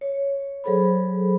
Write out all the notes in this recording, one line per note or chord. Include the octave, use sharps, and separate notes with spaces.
C#5
F#3 G#4 A4 C5 B5